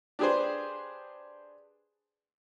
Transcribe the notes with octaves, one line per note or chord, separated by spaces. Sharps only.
D4 G4 G#4 B4 C5